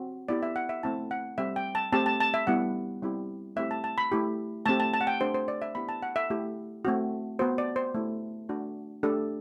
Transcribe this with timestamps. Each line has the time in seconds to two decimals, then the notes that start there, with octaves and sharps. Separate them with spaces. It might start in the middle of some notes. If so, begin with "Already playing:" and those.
Already playing: C4 F#4
0.28 B3 E4 G4 D5
0.43 E5
0.56 F#5
0.69 E5
0.83 A3 C4 E4 A5
1.11 F#5
1.38 G3 C4 G4 E5
1.56 G5
1.75 A5
1.93 A3 C4 G4 A5
2.06 A5
2.20 A5
2.34 E5
2.47 G3 B3 E4 G4 F#5
3.02 G3 C4 E4 G4
3.56 A3 C4 E4 G4 E5
3.71 A5
3.84 A5
3.98 B5
4.12 A3 E4 G4
4.66 A3 C4 G4 A5
4.80 A5
4.94 A5
5.01 F#5
5.07 G5
5.20 A3 D4 G4 C5
5.34 C5
5.48 D5
5.62 E5
5.75 B3 E4 G4 B5
5.89 A5
6.03 F#5
6.16 E5
6.30 A3 E4 G4
6.85 A3 C4 F#4
7.39 B3 F#4 C5
7.58 D5
7.76 C5
7.95 A3 E4 G4
8.49 A3 D4 F#4
9.03 A3 D4 G4 A4